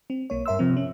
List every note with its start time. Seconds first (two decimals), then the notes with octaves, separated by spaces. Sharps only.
0.10 C4
0.30 B1 A#3 C#5
0.46 G2 A#4 E5 C6 E6
0.59 C3 F3 C4
0.77 C#4